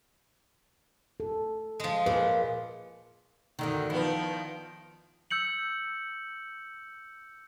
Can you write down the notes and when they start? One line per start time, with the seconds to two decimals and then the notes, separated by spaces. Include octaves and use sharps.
1.20 A4
1.80 F3 G#3
2.06 A#2 G#4 B4
2.24 B4
3.59 F#2 D3 D#3
3.90 D#3 F3 B3 E4
5.31 E6 G6 C#7 F#7